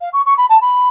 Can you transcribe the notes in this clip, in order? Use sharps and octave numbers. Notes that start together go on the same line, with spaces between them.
F5
C#6
C#6
B5
A5
B5